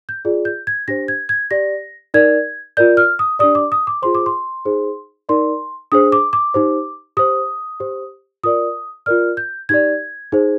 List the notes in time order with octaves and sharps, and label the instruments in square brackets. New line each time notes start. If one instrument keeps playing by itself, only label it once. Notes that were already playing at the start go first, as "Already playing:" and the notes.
[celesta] G6
F4 G#4 D5
G6
G#6
D4 G4 C5 A#6
G#6
G#6
G4 D5 A#6
D#4 A#4 D5 G#6
F4 A#4 D5 G6
F6
D#6
D4 G4 D5 D#6
D6
D#6
D6
F4 G#4 C5 C6
D6
C6
D#4 G#4 C5
D#4 A#4 D5 C6
D4 G#4 C5 D#6
D6
D6
D#4 G4 C5
G4 C5 D#6
G4 C5
F4 A#4 D5 D#6
F4 A#4 D5 F6
G6
D#4 G4 D5 G#6
D#4 G#4 C5